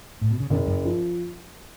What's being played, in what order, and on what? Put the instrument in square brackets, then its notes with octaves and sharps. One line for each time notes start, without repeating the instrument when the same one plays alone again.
[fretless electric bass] A2
B2
C#3
[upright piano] F#1 [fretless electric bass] B2 D3
[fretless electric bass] F#2
[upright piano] F3